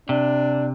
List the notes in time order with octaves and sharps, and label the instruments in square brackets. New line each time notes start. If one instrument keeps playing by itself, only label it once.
[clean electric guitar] C3 [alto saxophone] D4